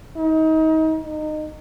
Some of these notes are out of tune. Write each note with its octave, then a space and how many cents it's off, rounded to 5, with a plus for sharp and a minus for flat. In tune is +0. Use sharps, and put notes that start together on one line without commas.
D#4 +30
D#4 -25